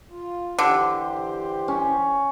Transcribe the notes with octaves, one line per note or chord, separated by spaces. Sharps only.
F4
D3 E3 G4 C5
C#4